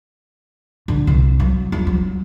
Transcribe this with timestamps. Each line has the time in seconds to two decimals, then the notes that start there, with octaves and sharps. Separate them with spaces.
0.88 D3
1.07 C2
1.40 F#3
1.72 F2
1.87 F#3